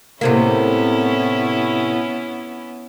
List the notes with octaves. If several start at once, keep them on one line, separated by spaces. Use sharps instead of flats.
A2 C3 A#3 B3 C#4 E4